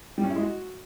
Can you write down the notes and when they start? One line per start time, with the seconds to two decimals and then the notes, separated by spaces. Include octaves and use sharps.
0.18 G3
0.24 C#4
0.30 E4
0.36 G#3
0.42 F#4